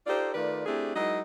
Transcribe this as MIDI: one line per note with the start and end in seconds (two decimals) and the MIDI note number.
0.07 0.30 63
0.07 0.30 65
0.07 0.30 67
0.07 0.30 69
0.07 0.30 72
0.07 0.30 74
0.34 0.64 51
0.34 0.64 57
0.34 0.64 65
0.34 0.64 71
0.34 0.64 74
0.66 0.94 57
0.66 0.94 60
0.66 0.94 62
0.66 0.94 64
0.66 0.94 67
0.66 0.94 68
0.96 1.21 54
0.96 1.21 56
0.96 1.21 63
0.96 1.21 64
0.96 1.21 70
0.96 1.21 75